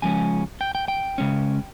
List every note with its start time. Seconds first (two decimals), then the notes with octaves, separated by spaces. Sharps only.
0.02 C#3 F3 G#3 C#4 G#5
0.61 G5
0.75 G5
0.88 G5
1.18 C#3 G#3 C#4